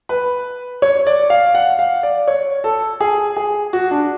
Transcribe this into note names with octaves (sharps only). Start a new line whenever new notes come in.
B4
C#5
D5
F5
F#5
F5
D5
C#5
A4
G#4
G#4
F#4
D4